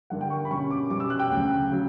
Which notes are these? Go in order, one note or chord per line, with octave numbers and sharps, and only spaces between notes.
G2 D3 A#3 F#5
G5
C#6
B5
B2 G3 C#4 C#6
D6
B2 G3 C#4 D6
E6
F#6
G5
D2 C#3 F#3
C#3 F#3